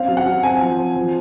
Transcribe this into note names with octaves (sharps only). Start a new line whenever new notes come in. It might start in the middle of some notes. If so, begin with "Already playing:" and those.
Already playing: C4 C#4 F5
F#3
F#5
F#3
C4 G#5
F3
C4
F3